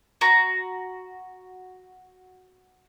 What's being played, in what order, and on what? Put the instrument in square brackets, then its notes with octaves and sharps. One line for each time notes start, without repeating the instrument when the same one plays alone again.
[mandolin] F#4 A#5